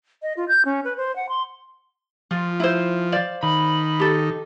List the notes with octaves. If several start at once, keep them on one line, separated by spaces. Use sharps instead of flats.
D#5
F4
G6
C#4
B4
C5
F#5
C6
F3 F4
E4 C5
C5 D5 F5
D#3 B5
G4 A4